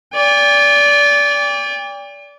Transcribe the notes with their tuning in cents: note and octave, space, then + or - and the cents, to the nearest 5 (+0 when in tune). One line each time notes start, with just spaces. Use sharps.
D5 -25 G5 +45